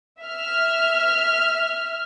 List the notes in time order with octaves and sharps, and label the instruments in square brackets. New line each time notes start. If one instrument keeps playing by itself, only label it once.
[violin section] E5 F6